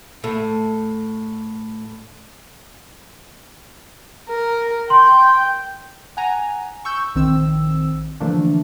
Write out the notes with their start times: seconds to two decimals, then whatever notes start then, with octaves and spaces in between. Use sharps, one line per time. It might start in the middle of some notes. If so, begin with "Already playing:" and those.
0.24 A2 A3
4.29 A#4
4.90 G5 C6
6.17 F#5 G#5 A#5
6.85 C#6 E6 G6
7.15 A#1 D#3 C4 E6
8.20 D3 E3 F3 A3 A#3 D4